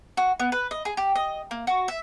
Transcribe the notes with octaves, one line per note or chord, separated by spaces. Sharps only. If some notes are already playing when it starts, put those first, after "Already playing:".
F#4
B3
B4
D#5
G#4
G4
D#5
A#3
F#4
E5